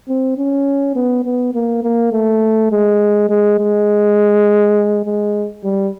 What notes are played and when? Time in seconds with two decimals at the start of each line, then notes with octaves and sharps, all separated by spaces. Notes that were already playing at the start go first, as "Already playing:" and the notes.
0.08 C4
0.37 C#4
0.95 B3
1.24 B3
1.54 A#3
1.83 A#3
2.12 A3
2.72 G#3
3.29 G#3
3.59 G#3
5.05 G#3
5.64 G3